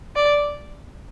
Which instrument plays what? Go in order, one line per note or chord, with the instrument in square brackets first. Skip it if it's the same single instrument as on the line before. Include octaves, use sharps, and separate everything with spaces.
[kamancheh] D5